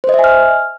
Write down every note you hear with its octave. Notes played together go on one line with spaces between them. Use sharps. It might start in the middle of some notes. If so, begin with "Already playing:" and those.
C5
D#5
E5
G#5
F6